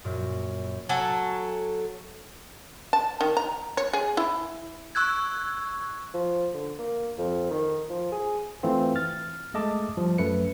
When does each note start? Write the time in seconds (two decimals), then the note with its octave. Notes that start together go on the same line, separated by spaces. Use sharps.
0.05 F#2 A#2
0.89 F#3 A4 G#5
2.93 A5
3.21 D#3
3.37 A#5
3.77 C#5
3.93 G#4
4.17 E4
4.95 C#6 E6 F#6 G#6
6.14 F3
6.54 D3
6.79 A#3
7.18 F2
7.51 D#3
7.89 F3
8.12 G#4
8.63 E3 A3 C4 F4
8.96 F6 A6
9.54 G#3 A3 D#5 E5 A5 D6
9.97 F3 G3
10.18 F#2 A3 B4 C#7